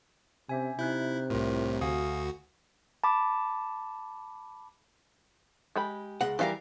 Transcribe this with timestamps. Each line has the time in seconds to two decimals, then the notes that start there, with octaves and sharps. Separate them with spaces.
0.49 C3 C#4 E5 G#5
0.79 C3 D#4 E4 F#6 G6
1.30 C2 A2 F4 A#4
1.81 D2 F#4 F5 G#5 D#6
3.04 A5 B5 D6
5.76 G#3 G4 B5
6.21 C#2 G#3 F#5
6.39 E3 G3 G4 A4 A#4 F5